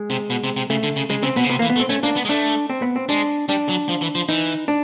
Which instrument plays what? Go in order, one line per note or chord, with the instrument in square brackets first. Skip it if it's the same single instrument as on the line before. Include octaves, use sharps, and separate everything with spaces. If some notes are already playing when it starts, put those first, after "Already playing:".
Already playing: [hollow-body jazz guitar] G#3
[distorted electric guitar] C3
B2
C3
C3
[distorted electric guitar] C#3 [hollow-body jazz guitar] A3
[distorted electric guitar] D3
C#3
[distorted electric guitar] C#3 [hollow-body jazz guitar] G#3
[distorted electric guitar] C#3 [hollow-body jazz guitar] C4
[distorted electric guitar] B2 [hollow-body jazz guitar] B3
[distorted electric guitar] C#3
[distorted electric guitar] C3 [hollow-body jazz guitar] B3
[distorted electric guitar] E3 [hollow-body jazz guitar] A#3
[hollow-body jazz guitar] B3
[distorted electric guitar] A3
[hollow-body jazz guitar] C4
[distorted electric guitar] A3 [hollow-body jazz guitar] C#4
[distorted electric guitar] A#3 [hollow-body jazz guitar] D4
[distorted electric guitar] B3
G#3
[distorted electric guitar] A3 [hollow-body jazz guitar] D4
[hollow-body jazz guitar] C4
B3
C4
[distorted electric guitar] G#3 [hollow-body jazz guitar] D4
[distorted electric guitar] G3 [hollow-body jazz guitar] D4
[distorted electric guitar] F#3
F3
E3
F3
[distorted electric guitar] E3 [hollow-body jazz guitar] D#4
[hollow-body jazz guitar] D4